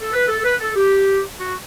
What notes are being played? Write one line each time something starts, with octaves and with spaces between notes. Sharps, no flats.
A4
B4
A4
B4
A4
G4
F#4